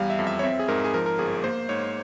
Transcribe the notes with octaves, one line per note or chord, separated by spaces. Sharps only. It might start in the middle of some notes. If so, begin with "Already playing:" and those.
Already playing: E2 G3 F5
E5
F2
E5
C#5
C4 E5
G#4
G#2 A#4
G#4
F3 A#4
A#4
G1 G#4
A#3 C5
G#2 C#5